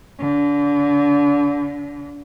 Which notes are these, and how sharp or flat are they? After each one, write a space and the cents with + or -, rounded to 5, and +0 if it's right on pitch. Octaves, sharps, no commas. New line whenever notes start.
D3 -35